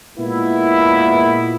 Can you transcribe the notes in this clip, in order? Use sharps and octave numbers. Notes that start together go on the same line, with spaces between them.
A#2 G#3 A#3 B3 E4